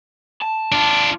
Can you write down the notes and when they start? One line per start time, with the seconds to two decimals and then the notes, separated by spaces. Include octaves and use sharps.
0.42 A5
0.72 D4 F4